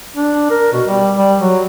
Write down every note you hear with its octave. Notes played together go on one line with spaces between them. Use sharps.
D4
A#4
B2
G3
G3
F#3